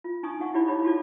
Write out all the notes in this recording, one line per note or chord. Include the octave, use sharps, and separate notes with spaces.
F4
D4 D#4 G#5 C#6 D#6
D4 D#4 G#4 F#5 C#6
E4 G4 D5 B5
D#4 G4 C#5 D#5 B5 D6
F4 F#4 A4 D5